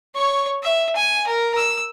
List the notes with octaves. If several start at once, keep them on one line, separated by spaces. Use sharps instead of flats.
C#5 C#6
E5
G#5
A#4
E6